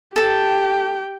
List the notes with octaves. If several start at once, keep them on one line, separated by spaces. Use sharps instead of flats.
G4 A4 G5 A5